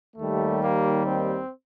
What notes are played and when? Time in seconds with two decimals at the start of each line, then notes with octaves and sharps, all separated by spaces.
0.17 D#2 D#3 G3 A3
0.62 A#3
1.06 C4